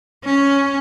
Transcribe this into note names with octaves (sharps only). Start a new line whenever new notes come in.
C#4